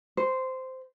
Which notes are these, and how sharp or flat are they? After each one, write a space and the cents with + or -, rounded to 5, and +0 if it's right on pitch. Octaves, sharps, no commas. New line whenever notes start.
C5 -10